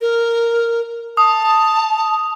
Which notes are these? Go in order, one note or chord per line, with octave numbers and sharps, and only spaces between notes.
A#4
A5 D#6